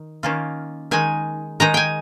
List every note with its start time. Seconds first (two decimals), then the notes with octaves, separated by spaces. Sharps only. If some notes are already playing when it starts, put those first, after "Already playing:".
Already playing: D#3
0.23 D#3 A#3 C#4 F4
0.91 D#3 G#3 D#4 G#5
1.60 D#3 G#3 D#4 A#5
1.74 G5 G#5